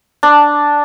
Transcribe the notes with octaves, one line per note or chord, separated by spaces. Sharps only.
D4